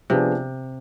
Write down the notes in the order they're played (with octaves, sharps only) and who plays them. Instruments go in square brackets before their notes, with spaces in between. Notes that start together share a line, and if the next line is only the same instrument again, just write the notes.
[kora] C3 [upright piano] F3 B3 D4 G#4